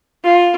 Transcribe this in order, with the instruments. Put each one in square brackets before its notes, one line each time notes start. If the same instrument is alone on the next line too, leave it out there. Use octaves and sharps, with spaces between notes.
[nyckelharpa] F4